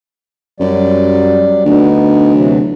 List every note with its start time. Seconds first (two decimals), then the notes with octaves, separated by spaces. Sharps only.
0.60 F#2 F#3 G3 D5
1.65 D2 B3 D#4
2.33 C3 E3 F#3